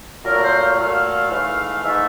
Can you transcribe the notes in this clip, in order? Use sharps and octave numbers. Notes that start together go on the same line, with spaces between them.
A#2 F#3 A3 A#4
C5
F5
A#2 F#3 A3 F5
G#2 E3 A3
G#2 E3 A3 E5